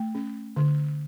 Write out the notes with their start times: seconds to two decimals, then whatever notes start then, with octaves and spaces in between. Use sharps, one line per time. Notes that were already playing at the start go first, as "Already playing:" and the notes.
Already playing: A3 G5
0.15 C#4
0.56 D3